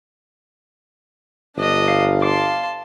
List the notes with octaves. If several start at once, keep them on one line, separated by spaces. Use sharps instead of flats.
G1 D4 D#5
F5
F5 A5 C6 D6